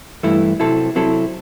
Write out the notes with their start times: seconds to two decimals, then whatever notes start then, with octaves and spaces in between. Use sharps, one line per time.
0.23 G2 E3 A3 E4
0.60 C3 F#3 C4 E4 A4
0.95 C3 F#3 C4 E4 A4